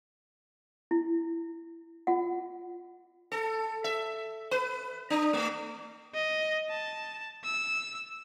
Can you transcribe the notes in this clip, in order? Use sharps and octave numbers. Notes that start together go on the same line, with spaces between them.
E4
F4 F#5
A4
E5
B4
D4
A3
D#5
A5
E6